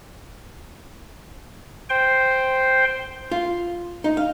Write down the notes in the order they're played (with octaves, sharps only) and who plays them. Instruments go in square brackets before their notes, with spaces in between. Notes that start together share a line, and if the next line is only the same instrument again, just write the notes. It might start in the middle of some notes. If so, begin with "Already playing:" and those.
[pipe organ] C5 G5 C6
[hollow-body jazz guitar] F4
D#4
F5